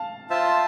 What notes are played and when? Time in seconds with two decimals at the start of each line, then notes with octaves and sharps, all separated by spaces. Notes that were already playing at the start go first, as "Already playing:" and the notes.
Already playing: F5 A5
0.30 F4 C5 E5 A5